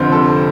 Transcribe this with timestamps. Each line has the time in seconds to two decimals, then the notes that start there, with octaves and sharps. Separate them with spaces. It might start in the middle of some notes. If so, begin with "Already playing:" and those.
Already playing: F1 F2 D3 C5
0.12 A4